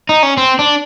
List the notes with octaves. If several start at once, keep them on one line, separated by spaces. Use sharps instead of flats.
D#4
C#4
C4
D4